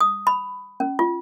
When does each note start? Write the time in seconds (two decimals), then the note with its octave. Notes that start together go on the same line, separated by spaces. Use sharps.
0.01 D#6
0.27 B5
0.80 C#4
0.99 F4